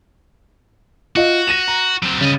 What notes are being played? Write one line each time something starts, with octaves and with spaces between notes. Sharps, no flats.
F4 F#4 D#5 F5
A#6 D#7 E7
A#5
F#3 C4
C#3 G3 D#5